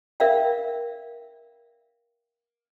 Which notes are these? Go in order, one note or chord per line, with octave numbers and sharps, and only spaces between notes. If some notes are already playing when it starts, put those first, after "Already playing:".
A#4 D5 E5 F5 G5